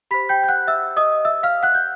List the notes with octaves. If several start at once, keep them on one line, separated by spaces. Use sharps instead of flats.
G4 C5 B5 B6
G5 G6
G6
F#5 F#6
E5 E6
D#5 D#6
E5 E6
F5 F6
F#5 F#6
G6